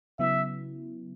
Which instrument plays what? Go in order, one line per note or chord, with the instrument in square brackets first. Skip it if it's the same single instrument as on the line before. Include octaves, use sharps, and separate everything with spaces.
[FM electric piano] C#3 F#3 B3 E4 [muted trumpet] E5